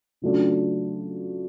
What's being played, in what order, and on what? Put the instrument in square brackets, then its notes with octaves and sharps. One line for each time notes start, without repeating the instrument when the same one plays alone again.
[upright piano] C#3 F#3 A3 D4 F4